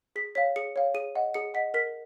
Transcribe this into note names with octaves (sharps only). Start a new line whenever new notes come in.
G#4 B6
C#5 F5 B6
G#4 C#7
C#5 F5
G#4 D#7
D#5 F#5
G#4 C#7
D#5 F#5 B6
A#4 B6